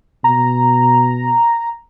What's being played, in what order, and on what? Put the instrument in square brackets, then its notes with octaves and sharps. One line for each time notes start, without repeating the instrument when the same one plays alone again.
[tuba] B2 [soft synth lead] A#5